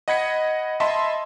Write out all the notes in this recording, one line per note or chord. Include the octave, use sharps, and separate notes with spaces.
D#5 F#5 B5 G#6 B6 C#7
D#5 E5 A5 B5 C6